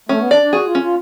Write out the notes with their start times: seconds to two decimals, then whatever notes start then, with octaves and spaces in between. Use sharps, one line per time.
0.09 A3 C#4
0.20 B3
0.30 D4 D5
0.42 D4
0.53 F#4 G#4
0.67 F4
0.75 C#4
0.82 F4